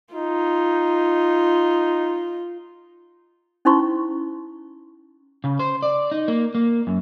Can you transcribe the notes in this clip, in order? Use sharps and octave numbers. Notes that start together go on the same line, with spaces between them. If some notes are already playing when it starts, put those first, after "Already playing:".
D#4 F4
C#4 D#4 E4 C5 C6 C#6
C#3
C5
D5
D#4
A#3
A#3
F#2